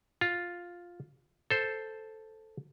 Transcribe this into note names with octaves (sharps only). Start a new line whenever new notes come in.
F4
A4 C5